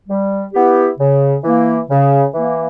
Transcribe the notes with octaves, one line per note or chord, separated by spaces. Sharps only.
G3
B3 E4 G4
C#3
E3 A#3
C#3
E3 A#3